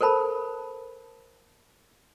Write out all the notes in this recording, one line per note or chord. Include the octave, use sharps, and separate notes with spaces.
A4 A#4 C5 A5 B5